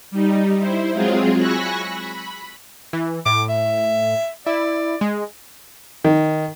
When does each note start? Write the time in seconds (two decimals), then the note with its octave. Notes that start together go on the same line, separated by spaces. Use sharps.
0.11 G3 D#4
0.60 E4 C5
0.93 F#3 G#3 C4 F4 G#4
1.37 G#5 B5 C#6 E6 F#6 A#6
1.94 B5
2.93 E3
3.26 A2 D6
3.49 E5
4.46 E4 D5
5.01 G#3
6.05 D#3